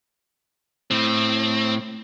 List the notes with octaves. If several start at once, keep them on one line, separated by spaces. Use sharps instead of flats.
A2 C4